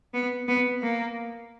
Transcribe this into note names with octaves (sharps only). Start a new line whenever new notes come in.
B3
B3
A#3